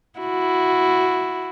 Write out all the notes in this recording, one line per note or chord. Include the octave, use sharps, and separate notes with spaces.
E4 F#4